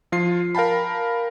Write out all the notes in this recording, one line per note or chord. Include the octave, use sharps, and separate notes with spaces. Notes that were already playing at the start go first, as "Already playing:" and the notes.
F3 F4 C7
A#4 F5 G5 A5 B5